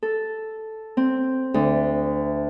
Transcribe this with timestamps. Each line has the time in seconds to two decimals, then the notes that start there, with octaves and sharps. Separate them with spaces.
0.03 A4
0.97 C4
1.54 D2